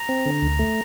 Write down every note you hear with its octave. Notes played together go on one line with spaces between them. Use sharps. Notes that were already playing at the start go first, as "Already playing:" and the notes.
Already playing: A#5
C4
D3
D2
A3